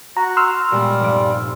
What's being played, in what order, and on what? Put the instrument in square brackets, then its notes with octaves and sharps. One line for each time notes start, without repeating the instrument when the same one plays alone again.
[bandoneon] F#4 [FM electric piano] A#5
[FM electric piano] C6 E6 F6
[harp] A#2 G#3 B3 [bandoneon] G3
[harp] F1 G2 D5